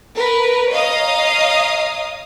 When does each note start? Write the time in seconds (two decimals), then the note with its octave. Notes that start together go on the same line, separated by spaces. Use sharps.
0.14 A#4 B4
0.71 C#5 D#5 F5 A#5 D#6